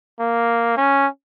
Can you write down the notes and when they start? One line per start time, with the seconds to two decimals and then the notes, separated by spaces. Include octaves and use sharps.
0.20 A#3
0.77 C#4